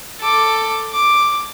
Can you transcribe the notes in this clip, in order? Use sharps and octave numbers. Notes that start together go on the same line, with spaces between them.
A4 D6
D6